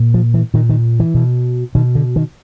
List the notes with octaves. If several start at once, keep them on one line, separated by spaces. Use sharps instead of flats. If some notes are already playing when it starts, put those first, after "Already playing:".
Already playing: A#2
F3
E3
A#2 D#3
D#3
E3
B2
B2 D#3
D3
D#3